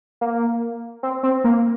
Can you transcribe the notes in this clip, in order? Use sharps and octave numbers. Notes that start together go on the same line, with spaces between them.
A#3
C4
C4
A#3